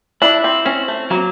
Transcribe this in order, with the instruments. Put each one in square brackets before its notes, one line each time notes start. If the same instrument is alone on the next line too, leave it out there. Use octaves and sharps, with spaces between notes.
[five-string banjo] D4 [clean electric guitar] E4
[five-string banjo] C4
[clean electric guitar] C4 [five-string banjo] C#4
[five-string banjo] A3
[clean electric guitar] F#3 [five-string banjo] A#3